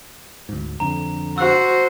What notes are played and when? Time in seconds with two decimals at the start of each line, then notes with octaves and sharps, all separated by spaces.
0.49 D2 G#2
0.80 F2 D3 A#5
1.38 F#4 C5 E6 F#6